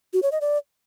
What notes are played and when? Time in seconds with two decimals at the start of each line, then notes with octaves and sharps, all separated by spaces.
0.13 F#4
0.23 C#5
0.32 D#5
0.41 D5